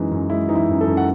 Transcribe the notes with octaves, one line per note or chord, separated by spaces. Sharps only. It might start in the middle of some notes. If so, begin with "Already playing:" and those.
Already playing: F#2 E3 G#3 D#4
F#2
G#3 E4
E3 D#4
E4
F#2
A4
F#2
F#5